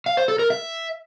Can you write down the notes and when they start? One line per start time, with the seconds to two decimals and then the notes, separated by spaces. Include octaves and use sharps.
0.06 F5
0.17 C5
0.28 A4
0.39 A#4
0.50 E5